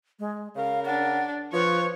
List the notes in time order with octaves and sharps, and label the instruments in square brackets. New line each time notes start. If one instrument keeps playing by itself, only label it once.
[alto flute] G#3
[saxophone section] C#3 A#4 [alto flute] F5
[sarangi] D4 [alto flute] F#5
[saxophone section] F3 [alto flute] B4 [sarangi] C#5